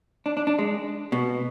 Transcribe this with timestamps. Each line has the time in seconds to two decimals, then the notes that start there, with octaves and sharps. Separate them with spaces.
0.26 D4
0.37 D4
0.47 D4
0.59 G#3
1.12 B2